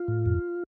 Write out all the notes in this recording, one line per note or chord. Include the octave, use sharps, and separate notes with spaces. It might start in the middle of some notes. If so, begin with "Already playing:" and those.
Already playing: F4
A2
F2